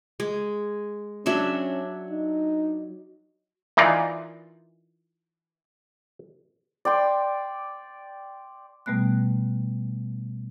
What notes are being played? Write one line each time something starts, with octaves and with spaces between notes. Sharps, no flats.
G#3
F#3 C#4 D4 E5
D#4
E3 D#4 F4 A#4 D5
D5 G5 C6
B2 G3 A3 B3 F#6